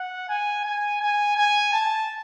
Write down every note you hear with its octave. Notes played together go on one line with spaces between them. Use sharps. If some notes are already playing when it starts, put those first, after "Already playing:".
Already playing: F#5
G#5
G#5
G#5
G#5
A5